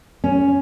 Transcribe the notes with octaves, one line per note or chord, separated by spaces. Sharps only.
C#4